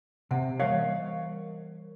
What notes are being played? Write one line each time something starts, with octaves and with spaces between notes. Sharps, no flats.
C3 E5 F#5
E3 G3 A#4 C#5 F5